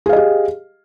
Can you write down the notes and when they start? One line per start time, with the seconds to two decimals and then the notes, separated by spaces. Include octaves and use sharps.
0.06 G#4
0.09 F5
0.13 D#5
0.16 G4